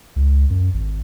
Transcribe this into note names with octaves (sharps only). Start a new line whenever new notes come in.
C#2
F#2
G#1